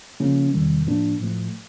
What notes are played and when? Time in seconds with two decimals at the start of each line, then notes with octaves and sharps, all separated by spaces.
0.20 C#3 F3 A#3 C#4 F4
0.53 E2 C3 D#3 G3
0.86 A2 F3 A#3 D4
1.20 A2 F3 A3